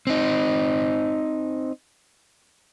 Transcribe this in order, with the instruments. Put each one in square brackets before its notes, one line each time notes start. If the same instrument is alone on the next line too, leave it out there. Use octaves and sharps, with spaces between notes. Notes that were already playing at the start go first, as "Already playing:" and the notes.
[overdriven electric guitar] C4 D#4